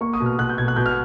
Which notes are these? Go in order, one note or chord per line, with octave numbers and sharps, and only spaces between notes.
A#3 C#6
D#6
B2
F6
B2 F#6
G6
B2 G#6
F#6
B2 G6
F6